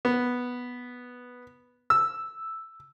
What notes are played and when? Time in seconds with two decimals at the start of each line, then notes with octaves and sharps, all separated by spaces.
0.05 B3
1.90 E6